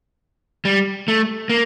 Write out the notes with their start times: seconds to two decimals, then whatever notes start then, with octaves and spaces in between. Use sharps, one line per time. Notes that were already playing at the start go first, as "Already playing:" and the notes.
0.65 G3
1.08 A3
1.49 A#3